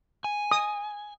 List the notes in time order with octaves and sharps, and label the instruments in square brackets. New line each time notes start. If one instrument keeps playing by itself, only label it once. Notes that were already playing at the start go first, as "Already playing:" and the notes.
[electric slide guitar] G#5
[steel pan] D#6